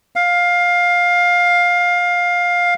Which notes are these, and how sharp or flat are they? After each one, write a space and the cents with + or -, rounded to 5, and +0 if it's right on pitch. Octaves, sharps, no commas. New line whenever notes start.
F5 +15